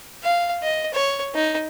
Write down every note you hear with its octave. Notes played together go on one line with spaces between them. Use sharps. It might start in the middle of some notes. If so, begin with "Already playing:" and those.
F5
D#5
C#5
D#4